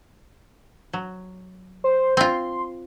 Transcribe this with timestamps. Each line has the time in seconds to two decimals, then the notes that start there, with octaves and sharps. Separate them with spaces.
0.93 F#3
1.84 C5
2.17 C4 F4 C6